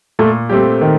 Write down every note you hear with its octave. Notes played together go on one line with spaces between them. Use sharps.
A#2 A3
G3 A3 C4 G4
D#3